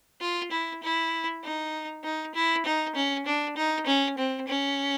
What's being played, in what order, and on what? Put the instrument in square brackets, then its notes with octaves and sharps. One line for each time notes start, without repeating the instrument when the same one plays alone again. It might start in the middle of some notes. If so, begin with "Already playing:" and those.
[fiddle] F4
E4
E4
D#4
D#4
E4
D#4
C#4
D4
D#4
C#4
C4
C#4